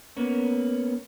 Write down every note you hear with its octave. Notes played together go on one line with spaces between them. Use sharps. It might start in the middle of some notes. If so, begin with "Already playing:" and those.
A#3 B3 C#4